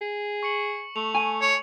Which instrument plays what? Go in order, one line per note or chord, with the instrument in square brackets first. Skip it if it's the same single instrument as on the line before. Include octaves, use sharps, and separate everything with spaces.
[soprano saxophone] G#4
[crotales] C#6 C#7 F#7
[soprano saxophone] A3 [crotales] F7
[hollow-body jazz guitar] G#5
[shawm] C#5